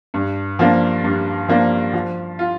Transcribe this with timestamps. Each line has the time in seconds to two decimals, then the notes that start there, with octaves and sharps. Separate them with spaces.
0.14 G2
0.59 F3 A#3 D4
1.04 G2
1.48 F3 A#3 D4
1.93 F3
2.39 F4